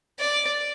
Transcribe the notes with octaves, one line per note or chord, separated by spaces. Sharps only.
D5